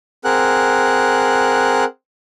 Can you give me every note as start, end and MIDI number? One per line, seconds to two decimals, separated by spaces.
0.25 1.84 60
0.25 1.84 68
0.25 1.84 70
0.25 1.84 78
0.25 1.84 90